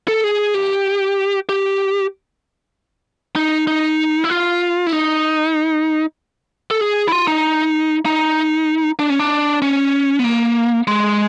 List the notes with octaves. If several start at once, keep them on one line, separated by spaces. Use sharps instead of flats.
A4
G#4
G4
G4
D#4
D#4
E4
F4
E4
D#4
A4
G#4
E4
F4
D#4
D#4
D4
C#4
D4
C#4
B3
A#3
G#3